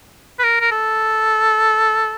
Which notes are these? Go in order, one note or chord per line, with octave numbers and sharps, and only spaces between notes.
B4
A#4
A#4
A4